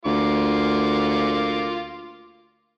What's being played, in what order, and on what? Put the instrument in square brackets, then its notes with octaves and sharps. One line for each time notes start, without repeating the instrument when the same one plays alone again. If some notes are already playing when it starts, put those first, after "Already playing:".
[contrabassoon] D2 [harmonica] A#3 F4 D6